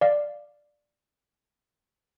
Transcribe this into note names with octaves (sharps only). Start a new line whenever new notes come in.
D5 F5